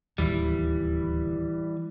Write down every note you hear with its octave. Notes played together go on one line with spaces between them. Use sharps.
D1 D#2 E3 G3